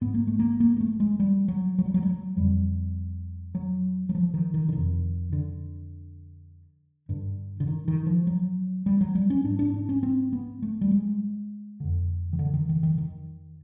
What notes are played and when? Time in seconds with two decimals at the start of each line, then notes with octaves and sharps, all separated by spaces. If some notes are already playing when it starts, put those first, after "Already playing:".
0.01 G#2 B3
0.14 A#3
0.27 A3
0.39 A#3
0.60 A#3
0.77 A#3
0.80 A3
1.00 G#3
1.20 G3
1.48 F#3
1.79 F#3
1.86 G3
1.94 F#3
2.03 G3
2.09 F#3
2.37 F2 D3 G3
3.55 F#3
4.09 F#3
4.15 F3
4.34 D#3
4.54 D#3
4.68 D3
4.72 F2 C3 D#3
5.33 D3
7.09 G2 D3
7.60 D3
7.68 D#3
7.88 D#3
8.07 F3
8.27 F#3
8.86 G3
9.01 F#3
9.15 G3
9.30 C#4
9.44 G#2 D4
9.59 D4
9.74 D4
9.89 C#4
10.03 C4
10.33 B3
10.62 A3
10.81 G3
10.91 G#3
11.80 F2 D3
12.33 D#3
12.39 D3
12.54 D#3
12.69 D#3
12.83 D#3
12.98 D#3